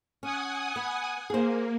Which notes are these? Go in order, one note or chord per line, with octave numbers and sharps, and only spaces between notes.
C#4 F#5 G#5 D#6
B3
A#3 G#4 C5